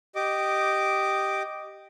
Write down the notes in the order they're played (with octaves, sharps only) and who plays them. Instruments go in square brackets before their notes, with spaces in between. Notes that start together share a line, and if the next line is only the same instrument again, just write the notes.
[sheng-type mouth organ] G4 D#5 D6